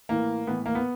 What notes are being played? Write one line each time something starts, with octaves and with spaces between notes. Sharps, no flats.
A2 E3 A#3
A2 E3 B3
A#3
B3